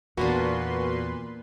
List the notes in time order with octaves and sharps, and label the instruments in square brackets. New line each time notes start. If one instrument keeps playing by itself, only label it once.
[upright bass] E2 [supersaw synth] A#2 B4 C6 [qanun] A#3 B3 D4 [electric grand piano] F#4